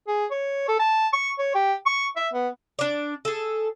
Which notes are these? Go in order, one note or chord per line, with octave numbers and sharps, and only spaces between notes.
G#4
C#5
A4
A5
C#6
C#5
G4
C#6
E5
B3
D4 D5
G#4 A4